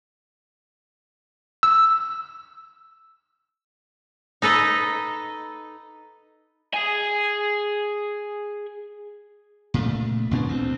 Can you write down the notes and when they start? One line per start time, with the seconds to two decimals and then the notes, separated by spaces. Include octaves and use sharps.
1.63 E6
4.42 D#4 A4 B4 D#5
6.74 G#4 G#5
9.74 A#2 C#3 A3
10.31 A1 A#2 B3 D4
10.49 D2 C4